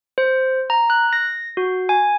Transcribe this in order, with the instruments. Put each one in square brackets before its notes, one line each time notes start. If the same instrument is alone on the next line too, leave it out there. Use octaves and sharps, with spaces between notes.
[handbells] C5
A#5
F#6
A#6
F#4
G#5